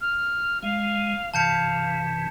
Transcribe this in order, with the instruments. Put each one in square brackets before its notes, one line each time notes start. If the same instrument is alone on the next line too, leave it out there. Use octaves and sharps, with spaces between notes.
[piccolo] F6
[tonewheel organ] G#3 [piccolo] F5
[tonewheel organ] G2 C3 E3 [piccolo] F5 [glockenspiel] A5 G6 C#7